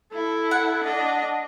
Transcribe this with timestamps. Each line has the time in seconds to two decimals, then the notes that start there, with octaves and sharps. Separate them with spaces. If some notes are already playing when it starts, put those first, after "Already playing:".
0.12 E4 A4
0.51 F#5
0.83 D4 D#5